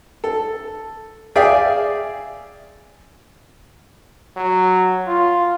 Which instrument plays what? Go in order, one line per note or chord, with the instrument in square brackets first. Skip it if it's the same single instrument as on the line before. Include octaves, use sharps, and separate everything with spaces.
[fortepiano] A4
G#4 D5 E5 F5 G5
[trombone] F#3
F4